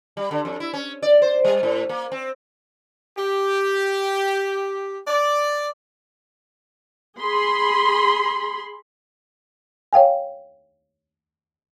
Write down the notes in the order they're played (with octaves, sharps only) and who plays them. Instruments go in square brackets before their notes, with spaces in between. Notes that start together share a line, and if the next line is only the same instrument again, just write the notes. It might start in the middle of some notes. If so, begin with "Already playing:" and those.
[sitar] G3
D3
F2
E4
C#4
D5
C5
G3
A2
A#3
C4
[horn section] G4
D5
[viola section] G#4 B5 C6
[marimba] C#5 F5 G5 G#5